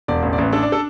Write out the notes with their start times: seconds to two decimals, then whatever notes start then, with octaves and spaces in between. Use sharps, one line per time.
0.08 E1 D5
0.23 A1
0.33 D5
0.38 A1 B4
0.53 D4 A4
0.63 D5
0.72 A4